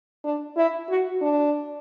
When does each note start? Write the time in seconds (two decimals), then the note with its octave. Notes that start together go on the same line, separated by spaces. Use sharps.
0.24 D4
0.57 E4
0.89 F#4
1.22 D4